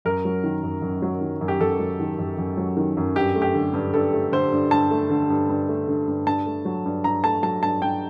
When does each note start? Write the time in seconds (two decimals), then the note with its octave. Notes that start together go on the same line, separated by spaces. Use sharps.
0.05 F#2 A#4
0.25 F#3
0.44 D#3
0.63 F#2
0.82 F#2
1.02 F#3
1.21 D#3
1.41 F#2
1.48 G4
1.60 F#2 A4
1.79 F#3
2.00 D#3
2.18 F#2
2.38 F#2
2.57 F#3
2.77 D#3
2.97 F#2
3.16 G2 G4
3.36 A3
3.42 G4
3.55 D3
3.74 G2
3.94 G2 A4
4.13 A3
4.32 D3 C5
4.52 G2
4.71 G2 A5
4.91 A3
5.10 D3
5.30 G2
5.49 G2
5.69 A3
5.88 D3
6.08 G2
6.27 G2 A5
6.46 A3
6.65 F#3
6.86 G2
7.04 G2 A#5
7.24 A3 A5
7.43 F#3 A5
7.63 G2 A5
7.82 G2 G5